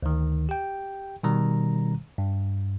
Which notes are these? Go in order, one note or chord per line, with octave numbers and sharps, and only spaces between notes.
D2 D#3
G4 G5
B2 D#3 G3 A#5
G2